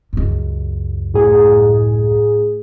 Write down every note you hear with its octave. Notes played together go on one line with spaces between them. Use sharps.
C#2 F#2
A2 G#4